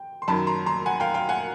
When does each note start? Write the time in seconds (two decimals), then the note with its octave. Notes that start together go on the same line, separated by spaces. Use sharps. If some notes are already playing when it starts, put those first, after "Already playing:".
Already playing: G5
0.22 C6
0.28 F#2 D#3 F#3 A5 B5
0.47 A#5 C6
0.66 A#5 C6
0.86 F#5 G#5
1.00 F5 G5
1.14 F5 G5
1.29 F#5 G#5